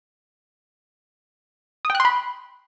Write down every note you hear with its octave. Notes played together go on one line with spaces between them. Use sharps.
D#6
G5
F#6
C6
B5